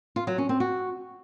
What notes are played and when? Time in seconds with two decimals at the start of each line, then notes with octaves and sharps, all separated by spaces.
0.16 F4
0.27 F#3
0.38 C#4
0.49 C4
0.60 F#4